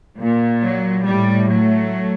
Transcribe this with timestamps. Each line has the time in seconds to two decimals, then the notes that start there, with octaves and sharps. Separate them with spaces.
0.19 A#2
0.63 F#3
1.07 A2 G3
1.51 F#3 A3